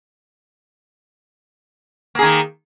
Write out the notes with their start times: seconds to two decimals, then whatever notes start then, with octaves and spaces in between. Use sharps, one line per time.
2.15 A#3
2.19 G#4
2.22 D#3